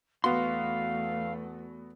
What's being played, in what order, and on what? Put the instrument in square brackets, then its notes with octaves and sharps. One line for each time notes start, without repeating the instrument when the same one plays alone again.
[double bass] E2 A3 [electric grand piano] B3 F#4 [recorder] F5 [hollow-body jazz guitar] C6